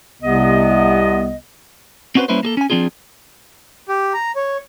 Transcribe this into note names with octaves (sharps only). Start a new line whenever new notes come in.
C2 C3 B3 D#5
C4 C#4 F#4 G#4 B4 C5
G3 A#3 C#4 E4 B4 C5
A#3 G#4 A4
C#4 G#5
F3 C4 D4 F4 G#4
G4
A#5
C#5